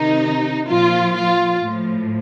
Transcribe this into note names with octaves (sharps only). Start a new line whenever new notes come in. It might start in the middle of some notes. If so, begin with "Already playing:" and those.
Already playing: C3 D#3 D#4
A#2 F3 F4
F4
A2
F3